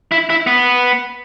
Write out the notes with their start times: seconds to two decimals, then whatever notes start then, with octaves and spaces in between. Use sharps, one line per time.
0.12 E4
0.30 E4
0.47 B3